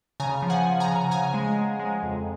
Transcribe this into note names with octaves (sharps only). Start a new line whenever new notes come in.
C#3 G#5 A#5
F3
F#5 G#5
F3
G#5 A#5
C#3
C#3 G#5 A#5
G#3
G#3
G#3
F2